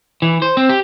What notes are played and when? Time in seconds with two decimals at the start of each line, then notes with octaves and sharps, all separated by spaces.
0.22 E3
0.42 C5
0.57 C4
0.69 G4